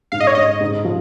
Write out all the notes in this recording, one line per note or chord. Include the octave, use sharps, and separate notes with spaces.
G#2 F5
D#5
C#5
G#2 D#5
G#2
F3